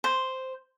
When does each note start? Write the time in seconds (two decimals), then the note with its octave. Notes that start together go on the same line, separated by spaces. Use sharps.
0.04 C5